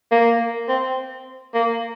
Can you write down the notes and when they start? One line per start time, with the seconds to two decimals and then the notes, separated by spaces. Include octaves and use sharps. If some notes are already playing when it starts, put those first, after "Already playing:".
0.11 A#3
0.69 C4
1.54 A#3